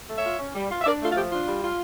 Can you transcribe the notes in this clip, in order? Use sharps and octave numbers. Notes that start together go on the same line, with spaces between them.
A3
C#5 E5
F4
C#4
G3
F4
E5
D4 A#4 D5
A3 F4 A4
F4
F3 G4
D4 F4
G3
F4